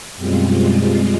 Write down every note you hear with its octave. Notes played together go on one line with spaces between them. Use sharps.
F#2 B2 G3 G#3 C4 F4